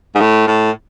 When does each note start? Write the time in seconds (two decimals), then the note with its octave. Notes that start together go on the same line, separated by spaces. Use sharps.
0.15 G#2
0.20 A2
0.47 A2